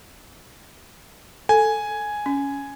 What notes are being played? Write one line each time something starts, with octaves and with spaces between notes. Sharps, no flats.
A4 G#5
C#4